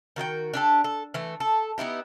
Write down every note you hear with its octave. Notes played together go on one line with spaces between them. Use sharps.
D#3 F#4 D#5 G5
D4 G4 A4
A4
E3 A3
A4
B3 D#4 E4 G4